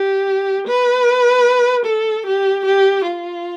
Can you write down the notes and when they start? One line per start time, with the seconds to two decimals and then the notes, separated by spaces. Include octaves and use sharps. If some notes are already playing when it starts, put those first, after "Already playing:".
Already playing: G4
0.68 B4
1.86 A4
2.26 G4
2.66 G4
3.06 F4